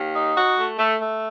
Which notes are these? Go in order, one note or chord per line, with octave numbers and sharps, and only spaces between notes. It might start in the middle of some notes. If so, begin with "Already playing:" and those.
Already playing: D#2
D#4
F#4
A3
A3
A3